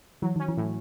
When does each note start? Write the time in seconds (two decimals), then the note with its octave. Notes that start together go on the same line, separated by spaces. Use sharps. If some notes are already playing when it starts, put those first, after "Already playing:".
0.22 E3 F#3
0.36 D#3 C#4
0.48 E3
0.57 A2